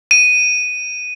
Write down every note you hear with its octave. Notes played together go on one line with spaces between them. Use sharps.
D#7